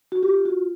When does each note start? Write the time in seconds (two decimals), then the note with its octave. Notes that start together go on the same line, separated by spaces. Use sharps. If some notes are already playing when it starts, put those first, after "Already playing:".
0.12 F#4
0.23 F4 G4
0.45 F#4